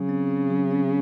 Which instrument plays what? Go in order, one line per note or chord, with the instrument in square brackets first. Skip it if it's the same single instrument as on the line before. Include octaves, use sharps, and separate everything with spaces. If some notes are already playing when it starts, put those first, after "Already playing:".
Already playing: [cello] C#3 [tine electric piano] F#3
[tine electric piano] C4
C4
F#3
C4